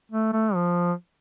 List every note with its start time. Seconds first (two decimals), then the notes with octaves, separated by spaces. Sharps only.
0.12 A3
0.33 A3
0.55 F3